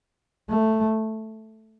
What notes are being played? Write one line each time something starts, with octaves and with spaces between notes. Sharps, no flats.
A3